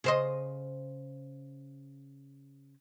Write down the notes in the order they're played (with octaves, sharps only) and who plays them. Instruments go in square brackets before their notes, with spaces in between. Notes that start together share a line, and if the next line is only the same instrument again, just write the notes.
[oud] C#3 C5 D#5